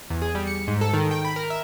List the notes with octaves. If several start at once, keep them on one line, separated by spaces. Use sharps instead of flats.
E2
G#4
G3
C#7
G#2
A4
D#3
G5
B5
A#4
E5